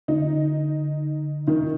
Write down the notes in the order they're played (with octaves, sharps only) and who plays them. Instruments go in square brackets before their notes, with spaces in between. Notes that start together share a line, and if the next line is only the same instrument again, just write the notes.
[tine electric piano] D3 [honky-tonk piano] D#4
[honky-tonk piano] D#3